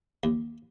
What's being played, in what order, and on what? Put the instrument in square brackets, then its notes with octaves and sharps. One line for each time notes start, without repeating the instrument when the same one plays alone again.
[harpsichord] D#2